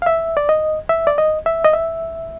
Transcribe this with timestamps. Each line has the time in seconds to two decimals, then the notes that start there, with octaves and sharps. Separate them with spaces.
0.02 F5
0.06 E5
0.37 D5
0.49 D#5
0.89 E5
1.07 D5
1.18 D#5
1.46 E5
1.64 D#5
1.73 E5